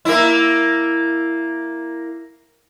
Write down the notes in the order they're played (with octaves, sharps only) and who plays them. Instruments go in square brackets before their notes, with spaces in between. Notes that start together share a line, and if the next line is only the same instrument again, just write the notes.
[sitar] A#3 E4